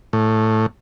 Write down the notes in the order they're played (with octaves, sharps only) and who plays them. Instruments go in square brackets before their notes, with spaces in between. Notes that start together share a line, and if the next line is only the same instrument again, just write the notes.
[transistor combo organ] A2